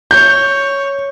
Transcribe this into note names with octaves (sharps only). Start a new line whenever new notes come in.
C#5 G6